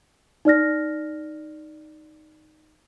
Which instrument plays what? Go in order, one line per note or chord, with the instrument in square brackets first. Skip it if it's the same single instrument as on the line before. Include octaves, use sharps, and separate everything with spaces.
[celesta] D#4 D5 F6 A#6